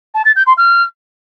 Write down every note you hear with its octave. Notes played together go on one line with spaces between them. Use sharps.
A5
A6
G6
C6
F6